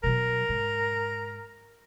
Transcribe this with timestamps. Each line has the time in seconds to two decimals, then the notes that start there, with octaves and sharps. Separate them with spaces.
0.04 B2 F#3 A#4
0.49 G#2